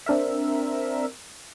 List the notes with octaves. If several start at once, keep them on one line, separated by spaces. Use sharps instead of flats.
C4 D4 A#4 E5